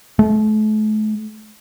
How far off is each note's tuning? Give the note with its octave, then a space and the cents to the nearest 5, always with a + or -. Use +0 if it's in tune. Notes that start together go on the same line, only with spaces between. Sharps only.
A3 -40